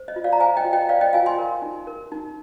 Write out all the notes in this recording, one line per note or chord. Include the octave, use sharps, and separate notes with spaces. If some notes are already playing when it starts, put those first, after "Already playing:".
Already playing: C5
D#5
F4
D5 F5
A#5
C5 F5 G#5
D#5 G5
F4
D#5 G5
C5 D5 F5
D#5 G5
F4 F5 G#5
G#5 C6
A#4
D#4
A#4
D#4